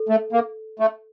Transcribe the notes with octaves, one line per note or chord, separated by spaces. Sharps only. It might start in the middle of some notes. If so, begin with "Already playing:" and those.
Already playing: A4
A3
A#3
A3